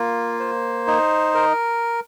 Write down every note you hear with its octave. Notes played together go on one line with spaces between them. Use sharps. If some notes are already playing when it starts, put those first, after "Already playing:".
Already playing: A#3 F4
C5
D#4
A#4